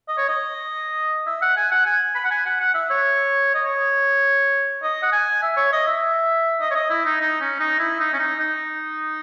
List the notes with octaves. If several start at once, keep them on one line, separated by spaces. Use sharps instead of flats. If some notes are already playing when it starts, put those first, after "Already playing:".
D#5
C#5
D#5
E5
F#5
G#5
F#5
G#5
B5
F#5
G#5
F#5
F#5
E5
C#5
D#5
C#5
D#5
F#5
G#5
E5
C#5
D#5
E5
D#5
C#5
D#5
E4
D#4
D#4
C#4
D#4
E4
D#4
C#4
D#4
D#4